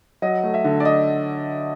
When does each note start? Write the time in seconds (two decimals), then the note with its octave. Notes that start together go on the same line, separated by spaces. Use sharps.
0.22 F#3 D#5
0.43 A3
0.54 E5
0.64 D3
0.80 D5
0.85 D#5